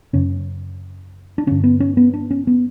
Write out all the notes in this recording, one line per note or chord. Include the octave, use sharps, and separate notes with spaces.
F#2 C#3 C#4
D4
G2 D3 C#4
B3
C#4
B3
D4
C#4
B3